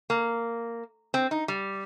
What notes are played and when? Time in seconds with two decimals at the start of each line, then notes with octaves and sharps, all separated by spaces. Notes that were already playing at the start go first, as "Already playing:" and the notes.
0.10 A#3
1.14 C4
1.31 D#4
1.48 G3